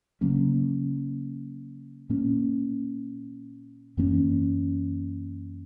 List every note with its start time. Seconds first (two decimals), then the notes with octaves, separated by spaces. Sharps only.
0.21 C#3 F#3 A#3 C#4
2.09 A#2 A#3 C#4
3.97 F#2 E3 A#3 C#4